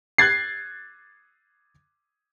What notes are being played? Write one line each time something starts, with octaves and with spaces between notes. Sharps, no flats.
F#6 G#6 A6 C7